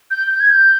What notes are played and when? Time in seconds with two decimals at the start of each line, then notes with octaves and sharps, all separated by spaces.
0.11 G6
0.31 G6
0.40 G#6
0.50 G6